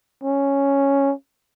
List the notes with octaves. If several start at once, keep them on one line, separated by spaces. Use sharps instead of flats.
C#4